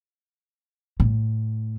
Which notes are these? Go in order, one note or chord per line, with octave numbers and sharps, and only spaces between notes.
A2